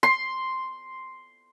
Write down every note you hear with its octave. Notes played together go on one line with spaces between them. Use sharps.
C6